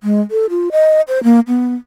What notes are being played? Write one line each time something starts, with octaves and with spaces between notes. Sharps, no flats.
G#3
A4
F4
D#5
C5
A#3
B3